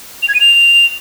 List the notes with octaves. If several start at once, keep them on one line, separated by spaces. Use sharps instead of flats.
F7
G#6
D#7
F7